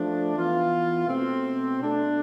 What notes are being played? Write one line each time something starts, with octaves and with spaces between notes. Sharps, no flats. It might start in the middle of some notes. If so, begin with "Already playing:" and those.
Already playing: F3 A3 D4
E3 B3 F4
B2 A3 C4
B2 A3 D4 A4